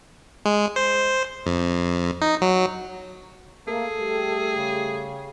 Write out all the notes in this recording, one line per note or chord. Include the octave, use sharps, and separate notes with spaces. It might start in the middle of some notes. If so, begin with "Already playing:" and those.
G#3
C5
F2
D#4
F#3
A3 A#3 G#4 A4
G3 A3 G4
C#3